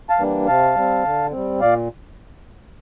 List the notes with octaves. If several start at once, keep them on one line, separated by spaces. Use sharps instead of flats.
F5 A5
E3 G3 A#3 D4
C3 F5 A5
G3 C4
D3
G3 C4
A#2 D5 F5